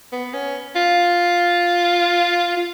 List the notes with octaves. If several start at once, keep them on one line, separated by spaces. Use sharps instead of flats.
B3
C#4
F4
F4